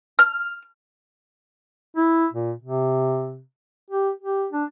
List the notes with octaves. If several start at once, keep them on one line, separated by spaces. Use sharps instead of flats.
F6
E4
A#2
C3
G4
G4
D4